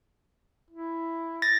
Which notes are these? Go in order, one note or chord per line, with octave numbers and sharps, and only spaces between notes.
E4
A6 A#6